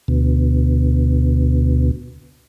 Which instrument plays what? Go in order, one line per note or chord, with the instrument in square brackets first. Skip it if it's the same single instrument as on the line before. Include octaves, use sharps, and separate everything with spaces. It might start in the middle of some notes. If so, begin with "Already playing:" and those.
[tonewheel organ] D2 B2